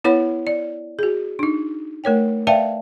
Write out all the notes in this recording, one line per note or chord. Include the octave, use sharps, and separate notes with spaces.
B3 E4 B4 C#5 F#5 B5
D5
F#4 G#4
D4 D#4
A3 A#4 C#5 G5
B4 D5 E5 F5 G5 A5